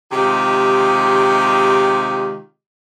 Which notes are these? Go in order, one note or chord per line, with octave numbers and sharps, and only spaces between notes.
C3 D#3 G#3 F4 G4 G#4